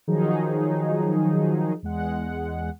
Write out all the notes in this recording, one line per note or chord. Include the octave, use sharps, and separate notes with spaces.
D#3 F3 F#3 D#4 G#4
E2 G#3 F#5